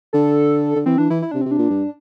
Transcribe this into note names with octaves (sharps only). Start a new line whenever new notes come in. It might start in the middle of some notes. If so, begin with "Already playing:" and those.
D3 A4
D3
E3 C4
E3 D4
E3 E4
E4
C3 D4
C3 C4
D4
A#2
G2